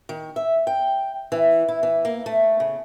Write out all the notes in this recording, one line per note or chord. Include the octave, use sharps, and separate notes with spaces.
D#3
E5
G5
E3
E4
E3
A#3
A3
C#3